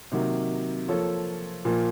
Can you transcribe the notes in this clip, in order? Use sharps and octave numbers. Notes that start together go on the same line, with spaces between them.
C3 D#3 F#3 A#3
F3 A#3 F4 A4 C#5
A#2 F3 A#3 F4